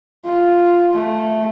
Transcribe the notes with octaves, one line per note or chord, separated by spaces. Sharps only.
F4
A3